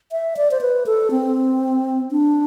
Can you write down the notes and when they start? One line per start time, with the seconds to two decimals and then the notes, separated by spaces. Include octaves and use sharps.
0.12 E5
0.37 D5
0.51 C5
0.61 B4
0.86 A4
1.11 C4
2.11 D4